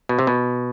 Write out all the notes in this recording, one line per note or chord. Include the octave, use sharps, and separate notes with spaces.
B2
C3
B2